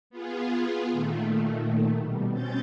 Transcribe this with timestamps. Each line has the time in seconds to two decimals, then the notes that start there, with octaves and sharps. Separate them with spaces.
0.10 B3 F4 G#4
0.92 A#2 D#3 A3
1.95 B2 G3
2.29 B2 C4 C#4 G6 A6